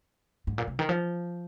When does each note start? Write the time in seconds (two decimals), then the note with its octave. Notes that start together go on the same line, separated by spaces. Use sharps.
0.47 G#2
0.58 A#2
0.67 C3
0.79 D#3
0.89 F3